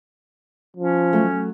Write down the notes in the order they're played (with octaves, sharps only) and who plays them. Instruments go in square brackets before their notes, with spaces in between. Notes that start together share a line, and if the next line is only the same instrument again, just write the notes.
[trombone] F3 [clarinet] C#4
[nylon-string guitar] F#3 A3